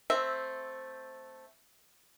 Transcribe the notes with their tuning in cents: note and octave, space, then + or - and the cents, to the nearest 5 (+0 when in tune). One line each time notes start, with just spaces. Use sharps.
A3 +0 C4 +0 E5 +0